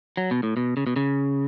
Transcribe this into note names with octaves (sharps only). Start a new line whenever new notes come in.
F#3
B2
A2
B2
C#3
B2
C#3